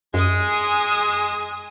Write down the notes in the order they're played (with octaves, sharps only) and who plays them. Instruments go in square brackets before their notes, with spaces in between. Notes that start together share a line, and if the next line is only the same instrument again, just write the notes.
[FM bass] F#2 [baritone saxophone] G#3 [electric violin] G#5 D#6